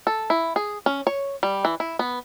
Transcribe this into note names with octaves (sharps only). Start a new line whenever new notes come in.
A4
E4
G#4
C#4
C#5
G3
E3
E4
B3